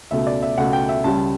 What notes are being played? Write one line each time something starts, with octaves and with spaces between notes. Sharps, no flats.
C#2 B2 A3 E5
D5
E5
C#2 B2 A3 F#5
G5
E5
C#2 C#3 G3 A5